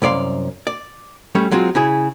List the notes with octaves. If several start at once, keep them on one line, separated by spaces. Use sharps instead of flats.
C2 F#2 D5 F5 C6
D5
G3 A3 C#4
F#3 G#3 C4 F4
C#3 E4 G#4